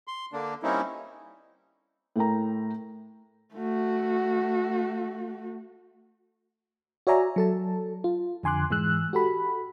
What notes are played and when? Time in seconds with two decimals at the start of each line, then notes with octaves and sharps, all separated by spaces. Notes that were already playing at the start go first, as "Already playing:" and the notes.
0.08 C6
0.33 D3 A#3 D4
0.63 G3 A#3 C4 C#4 D#4 E4
2.16 A2 A3 A#4 G5 A#5
3.54 A3 F#4
7.07 F#4 C#5 D5 E5 G#5 A#5
7.36 F#3 A4 A5
8.04 F4
8.43 F2 D3 G#5 C6 D6 F#6
8.70 G#2 E3 G#3 E6 F#6
9.13 F#4 G4 A4 B5